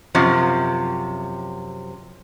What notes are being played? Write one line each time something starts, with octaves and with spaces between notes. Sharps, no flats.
F#2 C3 F3